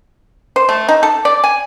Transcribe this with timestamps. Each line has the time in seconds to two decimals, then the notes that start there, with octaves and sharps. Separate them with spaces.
0.56 C5
0.69 A3
0.88 D#4
1.03 A4
1.25 D5
1.44 G#5